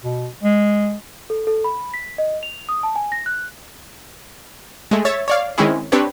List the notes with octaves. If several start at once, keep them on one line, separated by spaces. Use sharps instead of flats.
B2
G#3
A4
A4
B5
B6
D#5
F7
D#6
A5
G#5
A#6
F#6
G#3 A3
C#5 E5 A6
C#5 D5 F5
D#3 G#3 C4 C#4 E4 G#4
C4 D4 G4 B4 C#5